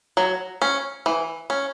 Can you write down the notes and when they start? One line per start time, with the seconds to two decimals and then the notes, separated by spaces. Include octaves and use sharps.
0.17 F#3
0.62 C#4
1.06 E3
1.50 C#4